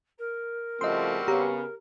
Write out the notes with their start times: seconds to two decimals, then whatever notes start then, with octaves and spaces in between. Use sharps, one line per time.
0.18 A#4
0.81 C#3 F3 G3 A3 C4 F#4 D#5 C6
1.28 C#3 B3 G4 A#5